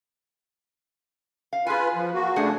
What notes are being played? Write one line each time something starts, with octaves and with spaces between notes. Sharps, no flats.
F5
F4 G#4 B4 G#5
F3
A#3 F#4
C#3 A3 D4 G#4 C5 F#5